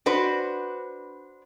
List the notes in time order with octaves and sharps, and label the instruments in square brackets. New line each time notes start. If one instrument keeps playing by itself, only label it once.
[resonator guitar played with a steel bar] D4 F#4 B4 C5